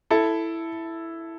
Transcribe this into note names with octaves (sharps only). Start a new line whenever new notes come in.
E4 A4